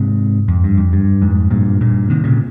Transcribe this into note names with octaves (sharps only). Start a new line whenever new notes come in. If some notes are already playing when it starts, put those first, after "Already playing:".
Already playing: G#2 C3
F2
G2
F2
G2
F2 G#2
G2 A#2
G2 A#2
C3 D#3
A#2 C#3